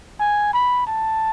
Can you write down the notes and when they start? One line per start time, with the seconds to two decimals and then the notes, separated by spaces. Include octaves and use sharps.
0.20 G#5
0.54 B5
0.87 A5